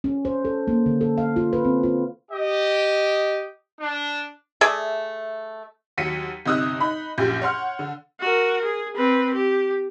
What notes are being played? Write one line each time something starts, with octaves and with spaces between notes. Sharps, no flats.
C#4
C5
A4
A#3
D3
A4
F5
F4
B4
C4
F4
G4 D#5
D4
A3 G#4 D5 E5
D#2 F#3 B6 C#7 D#7
G1 C3 D#4 D#6 E6 F#6
D#4 B5
A#1 F#2 A#2 G4 G6
C#5 F#5 C6 F6
D3
F#4 A#4
G#4
C4 B4
G4